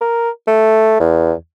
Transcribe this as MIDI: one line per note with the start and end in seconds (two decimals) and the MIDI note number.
0.01 0.30 70
0.48 0.99 57
1.00 1.33 40